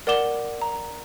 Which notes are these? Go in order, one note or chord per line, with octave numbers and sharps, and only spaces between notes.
A#4 D5 F#5 D6 E7 G7
A#5